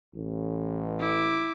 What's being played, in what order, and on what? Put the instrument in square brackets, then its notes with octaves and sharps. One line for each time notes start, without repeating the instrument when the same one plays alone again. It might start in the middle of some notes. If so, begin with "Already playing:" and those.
[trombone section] A1
[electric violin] E4 D6